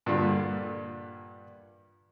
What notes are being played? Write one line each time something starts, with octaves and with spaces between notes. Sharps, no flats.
G2 A#2 D3 G3